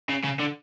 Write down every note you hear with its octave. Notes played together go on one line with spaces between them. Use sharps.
C#3
C#3
D3